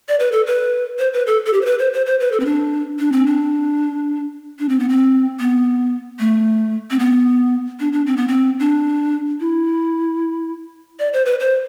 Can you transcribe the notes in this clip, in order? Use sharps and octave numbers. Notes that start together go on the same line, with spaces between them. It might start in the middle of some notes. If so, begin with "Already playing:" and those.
D5
B4
A4
B4
C5
B4
A4
A4
G4
C5
B4
C5
C5
C5
B4
A4
C4
D4
D4
C4
D4
D4
C4
B3
C4
B3
A3
C4
B3
D4
D4
C4
B3
C4
D4
E4
D5
C5
B4
C5